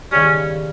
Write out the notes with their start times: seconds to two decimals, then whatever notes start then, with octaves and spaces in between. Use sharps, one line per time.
0.12 D#2 C#3 G3 C#4